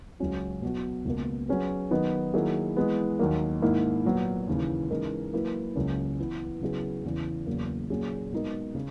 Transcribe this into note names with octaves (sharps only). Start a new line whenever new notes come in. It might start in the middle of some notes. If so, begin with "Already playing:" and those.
C#2 C#3 F#3 C#4 F#4
B2 F#3 B3 F#4
C#2 B2 A#3
F#3 C#4 G#4 B4
D#3 F#3 B3 D#4
D#3 F#3 A#3 E4 G#4
E3 G#3 B3
D#2 D#3 F#3 A#3
G#2 D#3 A#3 E4
A#2 F#3 B3
D#2 C#3 E3
C#3 E3 G#3 D#4 A#4
F#3 A#3 E4 B4
C#2 C#3 F#3 A#3 C#4
E3 B3 E4 B4
C#3 F#3 B3 E4 G#4
E2 C#3 E3
E2 C#3 F#3 A#3
A#2 F#3 C#4 G#4
B2 G#3 D#4 A#4
C#3